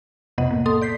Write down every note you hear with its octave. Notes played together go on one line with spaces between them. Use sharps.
B1 F2 C3 B3 D#5 F#5
A2 A#3
A4 C6 D#6
D5 G6 B6 C7